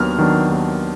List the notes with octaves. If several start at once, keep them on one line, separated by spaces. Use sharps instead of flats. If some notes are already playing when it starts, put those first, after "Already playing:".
Already playing: D#2 D#3 F#3 B3 D4 F6
D#3 F#3 B3 D4
D#2